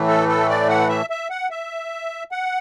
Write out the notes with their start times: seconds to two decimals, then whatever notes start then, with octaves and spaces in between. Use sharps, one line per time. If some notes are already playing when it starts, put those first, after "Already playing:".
Already playing: A2 E3 A3
0.08 A4
0.29 A4
0.49 D5
0.69 F#5
0.89 E5
1.10 E5
1.30 F#5
1.51 E5
2.32 F#5